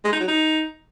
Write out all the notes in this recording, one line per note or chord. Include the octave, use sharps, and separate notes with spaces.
G#3
D#4
F#3
D#4